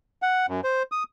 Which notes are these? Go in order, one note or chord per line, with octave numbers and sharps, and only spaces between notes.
F#5
F#2
C5
D#6